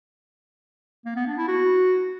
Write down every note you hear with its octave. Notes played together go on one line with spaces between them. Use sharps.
A#3
B3
D4
E4
F#4